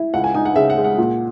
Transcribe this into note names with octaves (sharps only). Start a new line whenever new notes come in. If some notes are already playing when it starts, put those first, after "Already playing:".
Already playing: E4
C#2 F#5
G#5
D#4 G#5
F#5
C#3 E5
F#5
G#3
F#5
A#2